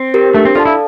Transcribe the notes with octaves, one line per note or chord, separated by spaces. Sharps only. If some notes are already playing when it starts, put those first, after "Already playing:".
Already playing: C4
G4 A#4
A3 D4
C4
F4 A4 D5 F5 A5
E4